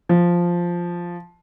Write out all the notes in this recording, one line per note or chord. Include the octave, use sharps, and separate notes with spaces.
F3